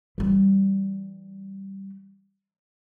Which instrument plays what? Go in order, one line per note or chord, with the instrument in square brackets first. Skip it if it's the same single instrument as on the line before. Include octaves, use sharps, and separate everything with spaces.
[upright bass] E3 G3